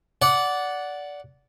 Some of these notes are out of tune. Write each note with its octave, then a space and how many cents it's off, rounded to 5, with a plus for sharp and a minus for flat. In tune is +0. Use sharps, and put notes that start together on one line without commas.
D5 -15 F#5 +0